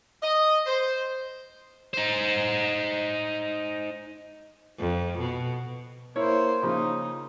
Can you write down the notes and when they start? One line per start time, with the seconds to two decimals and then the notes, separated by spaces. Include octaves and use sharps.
0.23 D#5
0.66 C5
1.94 D#4 C5
4.79 F2
5.19 B2
6.16 A#3 E4 C5 C#5
6.63 C#3 F3 A#3 D#4